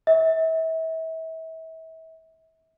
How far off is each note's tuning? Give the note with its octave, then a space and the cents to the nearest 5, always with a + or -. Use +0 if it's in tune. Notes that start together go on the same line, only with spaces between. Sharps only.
E5 -35